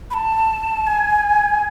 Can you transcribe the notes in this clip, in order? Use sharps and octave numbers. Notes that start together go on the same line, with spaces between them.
B5
A5
G#5